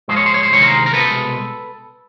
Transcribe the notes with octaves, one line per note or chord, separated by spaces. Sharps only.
G#2 F3 G#3 C5
C#5
C5
C#5
C5
D2 C3 D#3 G#3 C#5
A#4 C5
A#4
C2 B2 G#3 A4 B4